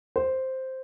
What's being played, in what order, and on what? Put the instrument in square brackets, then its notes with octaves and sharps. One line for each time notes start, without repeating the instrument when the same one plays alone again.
[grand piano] C5